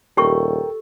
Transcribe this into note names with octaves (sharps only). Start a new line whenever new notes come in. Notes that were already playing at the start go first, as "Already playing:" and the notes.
D#1 G4 A4 A#4 G5 C#6